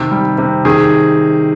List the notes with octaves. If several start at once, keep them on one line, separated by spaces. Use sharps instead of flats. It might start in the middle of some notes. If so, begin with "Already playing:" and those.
Already playing: C3 D#3
G3
C3
D#3 G#4